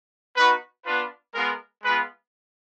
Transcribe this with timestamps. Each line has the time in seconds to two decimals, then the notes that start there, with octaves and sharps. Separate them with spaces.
0.36 B3 D#4 F#4 B4
0.84 B3 D4 F4 B4
1.34 G#3 B3 F4 A#4
1.83 G#3 B3 F4 B4